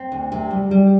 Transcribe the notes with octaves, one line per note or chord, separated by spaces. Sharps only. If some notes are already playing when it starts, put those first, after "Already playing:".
Already playing: C4
D2
C3
G3
G3